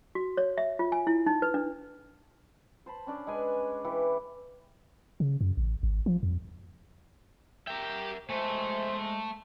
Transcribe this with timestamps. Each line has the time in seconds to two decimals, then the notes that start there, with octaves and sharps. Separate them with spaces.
0.15 F#4
0.37 C#5
0.58 E5
0.79 F4
0.92 G#5
1.07 E4
1.26 D#4
1.42 B4
1.54 D4
2.86 C5 A5 B5
3.07 C#4 D4 D5
3.27 G#3 B4 G#5
3.84 E3 E4 G4
5.20 C#3
5.41 F#2
5.57 A1
5.83 G#1
6.06 F3
6.23 F2
7.67 G4 A#4 E5 G5
8.30 G#3 A3 C5 E5 G#5